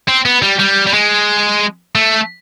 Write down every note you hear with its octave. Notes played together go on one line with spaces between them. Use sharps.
C4
B3
G3
G3
G3
G#3
A3